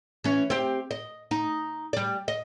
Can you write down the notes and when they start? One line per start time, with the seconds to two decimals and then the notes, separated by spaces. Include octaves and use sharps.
0.24 E3 C#4
0.50 C4 G4
0.91 D#5
1.31 D#4
1.93 G3 D5
2.28 D#5